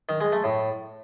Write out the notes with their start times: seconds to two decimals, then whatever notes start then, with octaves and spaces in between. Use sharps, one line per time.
0.09 D#3
0.21 G#3
0.32 A3
0.44 A2